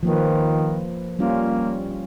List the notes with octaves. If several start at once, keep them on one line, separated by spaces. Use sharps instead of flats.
D#3 F3 A#3 B4
G3 A#3 C#4 F4